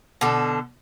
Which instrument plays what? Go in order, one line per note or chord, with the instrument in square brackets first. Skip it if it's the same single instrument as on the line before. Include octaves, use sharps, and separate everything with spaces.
[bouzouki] B2 D3 A4